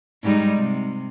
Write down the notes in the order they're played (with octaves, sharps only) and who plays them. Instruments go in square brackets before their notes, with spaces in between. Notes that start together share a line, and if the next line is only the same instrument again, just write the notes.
[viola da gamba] G#2 G3 D#4
C3